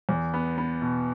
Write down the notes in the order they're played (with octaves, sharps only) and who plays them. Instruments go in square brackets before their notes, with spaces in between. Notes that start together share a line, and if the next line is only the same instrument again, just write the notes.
[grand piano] E2
B3
B3
B2